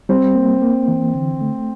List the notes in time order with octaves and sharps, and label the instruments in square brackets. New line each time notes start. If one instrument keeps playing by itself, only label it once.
[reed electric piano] G3 [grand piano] C4
[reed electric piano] A#3
A#3
E3
D3
A3